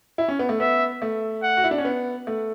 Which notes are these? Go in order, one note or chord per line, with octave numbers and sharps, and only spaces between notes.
E4
C#4
B3
A3
B3 E5
A3
F#5
F#4
E4
D4
C#4
B3
A3